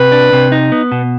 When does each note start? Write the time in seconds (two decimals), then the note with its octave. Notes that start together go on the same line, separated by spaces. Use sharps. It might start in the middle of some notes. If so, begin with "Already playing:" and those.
Already playing: C3 B4
0.12 D4
0.33 C3
0.52 D#4
0.72 B3
0.92 B2